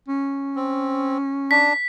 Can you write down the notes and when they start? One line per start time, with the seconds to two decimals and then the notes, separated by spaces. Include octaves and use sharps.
0.08 C#4
0.56 C4
1.51 D4 B6